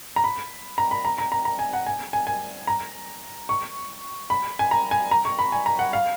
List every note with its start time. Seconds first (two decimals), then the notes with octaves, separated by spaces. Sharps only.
0.16 A#5
0.24 B5
0.78 A#5
0.91 B5
1.05 A#5
1.18 A#5
1.32 A#5
1.45 A#5
1.59 G#5
1.73 F#5
1.86 G#5
2.13 G#5
2.27 G#5
2.67 A#5
3.49 C#6
4.30 B5
4.59 G#5
4.71 A#5
4.91 G#5
5.11 A#5
5.25 C#6
5.39 B5
5.52 G#5
5.66 A#5
5.79 F#5
5.93 F5